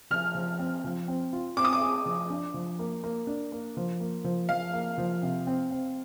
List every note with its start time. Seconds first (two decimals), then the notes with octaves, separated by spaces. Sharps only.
0.10 F3 F6
0.35 F3
0.59 C4
0.84 F3
1.08 C4
1.33 F4
1.57 C4 D6
1.65 D#6
1.73 D6
1.81 G#4
2.06 F3
2.30 D4
2.54 F3
2.79 A#3
3.04 A#3
3.27 D4
3.52 A#3
3.77 F3
4.00 A#3
4.24 F3
4.49 F3 F5
4.73 A#3
4.98 F3
5.22 C3
5.47 C4
5.71 C4